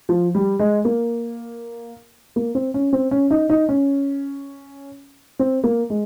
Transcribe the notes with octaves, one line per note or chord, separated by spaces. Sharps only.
F3
G3
G#3
A#3
A#3
C4
C#4
C4
C#4
D#4
D#4
C#4
C4
A#3
G#3